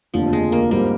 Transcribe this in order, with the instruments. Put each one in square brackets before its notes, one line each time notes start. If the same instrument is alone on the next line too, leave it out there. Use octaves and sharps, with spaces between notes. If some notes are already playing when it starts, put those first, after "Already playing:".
[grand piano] F1 D#2 D3 [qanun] F3
[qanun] G#3
A#3
[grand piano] G#2 G3 C4 [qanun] A#3